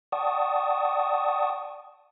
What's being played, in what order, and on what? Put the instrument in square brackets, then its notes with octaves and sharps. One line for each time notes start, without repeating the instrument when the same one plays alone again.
[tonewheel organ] D5 F#5 G5 A5 C#6 D#6